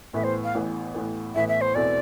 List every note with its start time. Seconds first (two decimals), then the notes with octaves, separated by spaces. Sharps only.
0.13 A1 A2 E3 B3 E5
0.24 C5
0.44 F5
0.55 A1 A2 E3 B3
0.94 A1 A2 E3 B3
1.35 A1 A2 E3 B3 E5
1.48 E5
1.61 C5
1.75 E2 B2 A3 C4 E4 D5